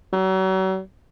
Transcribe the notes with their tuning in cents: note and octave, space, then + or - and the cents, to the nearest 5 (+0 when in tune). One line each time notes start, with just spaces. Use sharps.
F#3 +40